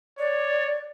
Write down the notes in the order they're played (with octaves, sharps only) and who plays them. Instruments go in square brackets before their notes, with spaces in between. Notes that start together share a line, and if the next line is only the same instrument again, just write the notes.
[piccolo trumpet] C#5 [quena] D5